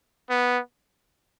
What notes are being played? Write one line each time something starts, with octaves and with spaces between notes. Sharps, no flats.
B3